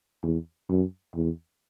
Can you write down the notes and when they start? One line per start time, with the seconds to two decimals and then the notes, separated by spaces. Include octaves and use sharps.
0.23 E2
0.69 F#2
1.15 E2